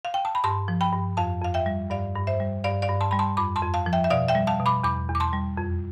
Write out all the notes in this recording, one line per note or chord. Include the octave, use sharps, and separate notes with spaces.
F5
G5
A5
B5
G2 A5 C6
F3
G5 B5
G2
F2 F5 A5
F2 F5
E5 G5
G3
G2 D5 F5
G2
C5 E5
G3
G2 D5 F5
D5 F5
G2
A5 C6
G3 B5
A5 C6
F2 B5 D6
A5 C6
F2
F5 A5
F3
E5 G5
E5
B2 D5 F5
E5 G5
G3
F5 A5
B2
B5 D6
E2 B5 D6
E2
D6
A5 C6
G3
F2